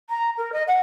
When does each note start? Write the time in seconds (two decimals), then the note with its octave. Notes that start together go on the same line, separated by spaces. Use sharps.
0.09 A#5
0.37 A#4
0.52 D#5
0.67 F#5